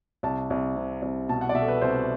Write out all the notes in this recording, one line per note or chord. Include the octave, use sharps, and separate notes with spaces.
C2 A5
C2
C3
C2
B2 A5
F#5
D5
B2 E5
A4
B4
C2 C5